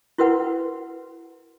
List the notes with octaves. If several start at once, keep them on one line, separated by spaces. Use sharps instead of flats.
E4 F#4 A#4 B4 F#5